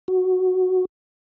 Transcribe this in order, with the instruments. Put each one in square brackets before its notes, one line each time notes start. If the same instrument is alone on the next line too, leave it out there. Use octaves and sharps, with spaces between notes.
[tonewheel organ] F#4